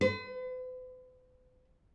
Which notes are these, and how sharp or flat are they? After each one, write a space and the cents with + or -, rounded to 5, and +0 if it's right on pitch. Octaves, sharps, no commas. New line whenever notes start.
B4 +45